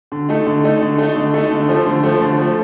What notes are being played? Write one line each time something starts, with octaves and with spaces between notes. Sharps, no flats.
D3
A3 D#4
D3
A3 D#4
D3
A3 D#4
D3
A3 D#4
D3
F3 A3
D3
F3 A3
D3
F3 A3